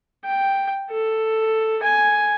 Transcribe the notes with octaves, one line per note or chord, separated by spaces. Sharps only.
G5
A4
G#5